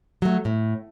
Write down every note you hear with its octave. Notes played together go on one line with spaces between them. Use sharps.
F#3 A3
A2